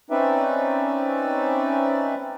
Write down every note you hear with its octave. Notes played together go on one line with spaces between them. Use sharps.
C4 C#4 D#4 B4 D5 E5